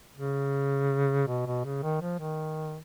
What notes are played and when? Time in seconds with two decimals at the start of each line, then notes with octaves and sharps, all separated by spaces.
0.16 C#3
1.27 B2
1.46 B2
1.64 C#3
1.83 D#3
2.01 F3
2.19 D#3